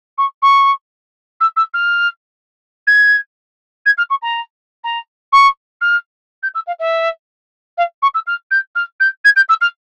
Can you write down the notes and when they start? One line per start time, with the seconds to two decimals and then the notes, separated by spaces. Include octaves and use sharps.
0.18 C#6
0.42 C#6
1.40 E6
1.56 E6
1.73 F6
2.87 G#6
3.86 G#6
3.97 F6
4.10 C#6
4.22 A#5
4.84 A#5
5.32 C#6
5.81 F6
6.42 G6
6.54 E6
6.67 F5
6.79 E5
7.77 F5
8.02 C#6
8.14 E6
8.27 F6
8.51 G6
8.75 F6
9.00 G6
9.24 G#6
9.36 G6
9.49 E6
9.61 F6